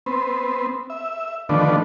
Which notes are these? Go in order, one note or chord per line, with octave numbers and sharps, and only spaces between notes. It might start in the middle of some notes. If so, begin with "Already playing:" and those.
B3 C4
E5
D3 D#3 F3 A3 B3 D4